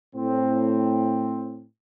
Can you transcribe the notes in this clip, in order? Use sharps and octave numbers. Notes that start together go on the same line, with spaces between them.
A2 C4